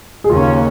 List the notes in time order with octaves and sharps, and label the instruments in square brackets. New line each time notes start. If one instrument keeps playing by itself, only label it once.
[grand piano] G#4
[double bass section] D#2 C#3 A#3 C#4 [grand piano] F4